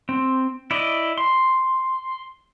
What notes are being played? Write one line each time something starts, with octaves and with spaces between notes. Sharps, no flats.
C4
E4 D5 D#5
C6